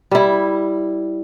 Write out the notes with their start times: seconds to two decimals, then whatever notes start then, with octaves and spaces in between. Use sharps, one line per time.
0.11 G3 E4